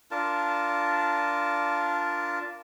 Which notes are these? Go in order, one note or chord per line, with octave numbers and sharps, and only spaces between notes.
D4 F4 A#4 A5